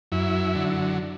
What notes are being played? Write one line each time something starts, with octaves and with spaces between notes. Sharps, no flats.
F#2 E4
D3 F#3